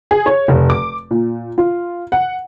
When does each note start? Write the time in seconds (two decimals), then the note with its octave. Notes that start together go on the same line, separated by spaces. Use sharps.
0.11 G#4
0.26 C#5
0.48 F1
0.70 D6
1.11 A#2
1.58 F4
2.12 F#5